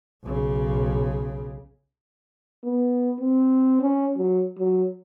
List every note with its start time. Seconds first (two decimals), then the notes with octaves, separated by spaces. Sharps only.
0.24 B1 C#3
2.64 B3
3.20 C4
3.81 C#4
4.17 F#3
4.59 F#3